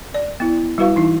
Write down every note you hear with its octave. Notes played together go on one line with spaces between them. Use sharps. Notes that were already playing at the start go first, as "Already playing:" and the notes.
D5
B3 E4
G3 E4 F#4 B4 F5 C#6
E3 D#4 E4